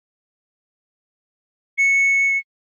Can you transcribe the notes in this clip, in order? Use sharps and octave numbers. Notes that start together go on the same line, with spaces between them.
C#7